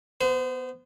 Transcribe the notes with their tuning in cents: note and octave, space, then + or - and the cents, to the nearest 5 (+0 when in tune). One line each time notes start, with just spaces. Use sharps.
B3 +0 C5 -35